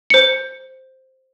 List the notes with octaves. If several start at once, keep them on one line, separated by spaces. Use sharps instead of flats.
C5 C#7